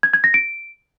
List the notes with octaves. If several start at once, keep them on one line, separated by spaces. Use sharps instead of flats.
G#6
G#6
A#6
D7